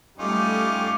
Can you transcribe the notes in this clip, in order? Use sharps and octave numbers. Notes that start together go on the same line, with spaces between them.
G3 A3 C#4 D#4 F4 D6